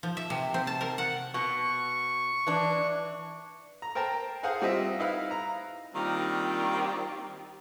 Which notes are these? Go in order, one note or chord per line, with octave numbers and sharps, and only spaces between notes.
F3
E5
C3
C4
A5
A#4
F#5
B2 C#6
E3 D4
A#5
A#4 C5 G5 A5 A#5
G#4 C5 F5 F#5 G#5
G3 C4 F4 D#5 E5
D#4 E4 B4 F5
A#5
D#3 G3 A#3 C4 D4 F4